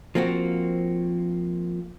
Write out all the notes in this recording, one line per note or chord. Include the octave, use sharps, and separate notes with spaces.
F3 A#3 C4 F#4